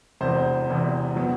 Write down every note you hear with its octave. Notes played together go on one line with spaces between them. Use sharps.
E1 E2 C3 C5
E1 E2 C3
B2 F#3